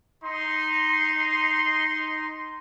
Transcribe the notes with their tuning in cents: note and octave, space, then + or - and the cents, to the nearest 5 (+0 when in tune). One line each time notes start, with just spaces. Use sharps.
D#4 +0 C6 -5